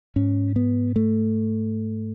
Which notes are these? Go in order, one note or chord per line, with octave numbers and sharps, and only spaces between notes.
G#2 C#4
B3
A3